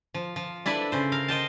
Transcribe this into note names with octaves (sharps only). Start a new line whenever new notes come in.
F3
F3
D4 E4 A4 B4 D5
C#3 C5
A#4 F5
C5 D#5 G5 A5